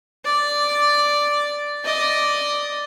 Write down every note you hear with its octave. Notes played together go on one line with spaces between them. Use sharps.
D5
D5 D#5